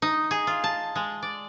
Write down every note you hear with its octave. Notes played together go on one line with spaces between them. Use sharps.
D#4
G#4
F4
A5
G#3
D5